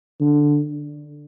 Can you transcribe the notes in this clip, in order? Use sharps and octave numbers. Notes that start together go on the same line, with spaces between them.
D3